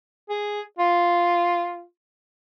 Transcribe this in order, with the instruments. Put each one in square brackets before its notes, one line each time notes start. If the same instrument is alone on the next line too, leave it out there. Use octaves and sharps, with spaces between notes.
[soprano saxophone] G#4
F4